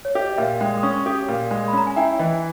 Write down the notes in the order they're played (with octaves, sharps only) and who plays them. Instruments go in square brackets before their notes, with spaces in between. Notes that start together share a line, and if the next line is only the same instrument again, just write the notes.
[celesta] C#5
[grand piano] G4 [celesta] D#5
[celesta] D#5
[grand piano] A#2 [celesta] E5
[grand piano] G#3 [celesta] G5
[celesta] D#6
[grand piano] C#4 [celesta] C#6
[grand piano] G4 [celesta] D#6
[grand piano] A#2
G#3
[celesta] B5
[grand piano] C#4 [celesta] A#5
[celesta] G#5
[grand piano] E4 [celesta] G5
[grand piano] E3 [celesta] D#5